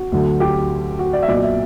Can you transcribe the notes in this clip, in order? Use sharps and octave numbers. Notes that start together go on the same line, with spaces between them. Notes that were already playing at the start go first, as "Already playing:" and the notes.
Already playing: F#4
D2 D3 F#3
G4
F#4
D5
E5
B1 A#2 F#3 D5
E5